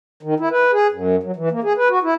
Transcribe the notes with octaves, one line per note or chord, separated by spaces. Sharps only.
D#3
E4
B4
G#4
F#2
F#3
E3
A#3
G#4
B4
F#4
E4